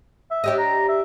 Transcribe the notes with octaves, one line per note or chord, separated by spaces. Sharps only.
E5
D4 G4 D#5
A#5
E5